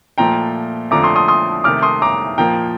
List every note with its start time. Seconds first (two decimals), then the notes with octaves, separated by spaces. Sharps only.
0.18 A#2 F3 A3 G5 A#5
0.91 F2 D3 F3 A3 A#5 D6
1.03 C6 D#6
1.16 C6 D#6
1.28 C6 D#6
1.64 C3 D#3 A3 D6 F6
1.83 C6 D#6
2.02 A#5 D6
2.38 A#2 F3 A#3 G5 A#5